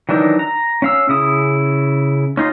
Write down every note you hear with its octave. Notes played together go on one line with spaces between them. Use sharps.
D#3 E3 F#3 D4 D#4
A#5
C#4 F5 E6
C#3 E4 D#6
C#4 D#4 F4